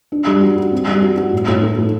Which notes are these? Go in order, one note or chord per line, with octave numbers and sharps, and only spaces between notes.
D4
G3
F#4
F#4
C4
G3
F#4
F#4
A2
A2
A3
A2